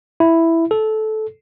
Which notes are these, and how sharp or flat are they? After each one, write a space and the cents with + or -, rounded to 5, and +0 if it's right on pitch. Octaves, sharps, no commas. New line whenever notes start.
E4 +0
A4 -15